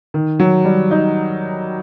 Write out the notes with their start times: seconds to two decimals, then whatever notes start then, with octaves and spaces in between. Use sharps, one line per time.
0.14 D#3
0.40 F#3
0.65 G3
0.91 D#4